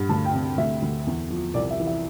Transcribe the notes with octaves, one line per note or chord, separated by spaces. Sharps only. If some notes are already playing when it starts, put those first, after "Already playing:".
Already playing: G2
D2 A5
G5
C3
D2 E5
D2
E2
F3
C2 D5
E5
E3
E5